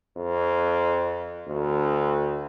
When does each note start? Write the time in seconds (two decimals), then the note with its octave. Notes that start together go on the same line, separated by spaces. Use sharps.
0.17 F2
1.48 D2